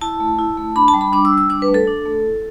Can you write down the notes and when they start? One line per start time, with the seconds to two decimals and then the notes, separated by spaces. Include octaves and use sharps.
0.01 E4 A5
0.20 A3
0.39 E4
0.57 A3
0.76 D4 B5
0.88 A5
0.94 G3
1.01 B5
1.13 D4 D6
1.25 E6
1.32 G3
1.38 E6
1.50 D4 D6
1.62 B4
1.68 A3
1.74 A4
1.87 D4
2.05 A3
2.24 E4